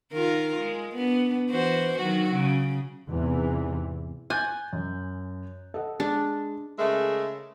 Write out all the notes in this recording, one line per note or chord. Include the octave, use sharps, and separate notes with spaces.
D#3 F4 A#4
G#3
B3 D4
E3 F#4 C5
D#3 F#3 F#4
C#3
E2 G#2 C3 E3
G#5 F#6 G6 A6
F#2
A4 D#5 F#5
G#3 D4
C#3 G#3 A3 A#4 E5